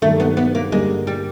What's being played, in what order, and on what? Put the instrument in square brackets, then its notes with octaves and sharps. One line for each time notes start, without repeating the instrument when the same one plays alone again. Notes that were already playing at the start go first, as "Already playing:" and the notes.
[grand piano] G2 D#3 F#3 A#3 [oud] A3
[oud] B3
B3
A#3
[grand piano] G2 D3 G3 A#3 [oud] G#3
[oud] G3